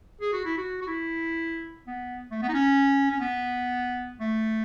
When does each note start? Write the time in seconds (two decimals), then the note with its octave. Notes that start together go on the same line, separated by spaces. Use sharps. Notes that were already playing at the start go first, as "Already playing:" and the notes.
0.21 G#4
0.33 F#4
0.45 E4
0.57 F#4
0.82 F#4
0.87 E4
1.87 B3
2.31 A3
2.42 B3
2.49 D#4
2.54 C#4
3.11 C#4
3.20 B3
4.20 A3